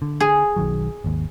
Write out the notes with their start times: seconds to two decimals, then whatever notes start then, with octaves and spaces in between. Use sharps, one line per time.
0.02 D3
0.20 G#4
0.56 B1 D#3 F#3
1.04 G#1 D#2